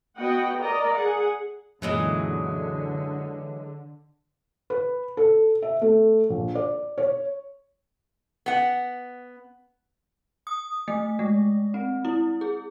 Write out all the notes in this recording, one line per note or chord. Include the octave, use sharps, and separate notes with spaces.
B3 F#4 D#5 F#5 G5
A#4 D5 D#5 A#5
G#4 F#5
F#2 A#2 D3 E3 F#3 G#3
B4
A4
E5
A3
A#1
D5
C#5
B3 F#5
D#6
A3
G#3
C4
E4
G#4